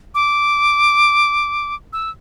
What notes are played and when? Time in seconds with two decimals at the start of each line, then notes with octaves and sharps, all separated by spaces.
0.15 D6
1.93 E6